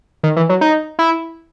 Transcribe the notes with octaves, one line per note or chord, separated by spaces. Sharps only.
D#3
E3
F#3
D#4
E4